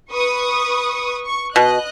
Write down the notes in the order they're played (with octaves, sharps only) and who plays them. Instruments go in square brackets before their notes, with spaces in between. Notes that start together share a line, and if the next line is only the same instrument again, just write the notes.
[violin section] B4 C#6 D#6
C#6
[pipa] B2 [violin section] D#5 F#6